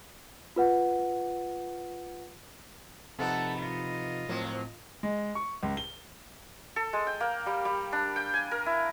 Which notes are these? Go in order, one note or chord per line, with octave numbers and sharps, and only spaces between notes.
F4 B4 F#5
C3 F3 A3 B3 D#4 A4 F#5
F4 D#5
A2 F3 F#3 A#3 C4
G#3
C#6
C#2
G7
A4
G#3
G5
A#3
G3
G3
D4
G5
G#5
A#4
E4